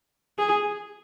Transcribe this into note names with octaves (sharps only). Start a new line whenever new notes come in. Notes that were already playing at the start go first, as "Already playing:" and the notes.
G#4